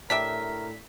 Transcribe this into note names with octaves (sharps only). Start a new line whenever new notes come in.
A2 D4 G4 A#4 E5 B6